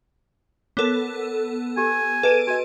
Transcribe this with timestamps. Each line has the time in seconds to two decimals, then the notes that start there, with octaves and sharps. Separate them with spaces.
0.77 B3 A4 A#4 C#5 D6
1.77 G4 G#5
2.23 G#4 A4 B4 D#5 D7 D#7
2.47 F#4 D#5 G#5